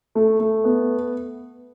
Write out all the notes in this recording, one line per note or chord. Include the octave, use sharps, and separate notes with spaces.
A3
A3
B3